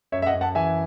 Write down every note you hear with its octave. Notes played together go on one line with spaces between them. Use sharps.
F#2 C#5 E5
E5
D#5 F#5
F#2
F#5 A5
E3 E5 G#5